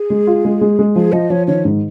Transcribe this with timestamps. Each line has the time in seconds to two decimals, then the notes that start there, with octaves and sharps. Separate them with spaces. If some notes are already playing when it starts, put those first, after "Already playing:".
Already playing: G#4
0.10 G#3
0.27 F4
0.45 G#3
0.61 G#3
0.79 G#3
0.96 F3 G#4
1.12 F3 D#5
1.30 F3 C#5
1.47 D#3 C#5
1.65 G#2